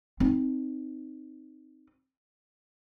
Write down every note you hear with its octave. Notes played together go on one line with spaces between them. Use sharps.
C4 D#4